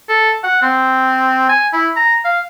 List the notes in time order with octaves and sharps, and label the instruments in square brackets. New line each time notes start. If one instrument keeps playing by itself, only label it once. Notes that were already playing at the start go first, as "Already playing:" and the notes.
[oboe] A4
F#5
C4
G#5
E4
A#5
F5